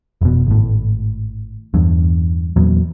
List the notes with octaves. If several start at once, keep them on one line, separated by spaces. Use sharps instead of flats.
F1 B2
G#1 A2
E2 G2
E2 A#2 F#3